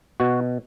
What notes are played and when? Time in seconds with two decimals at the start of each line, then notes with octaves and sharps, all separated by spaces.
0.20 B2 F#4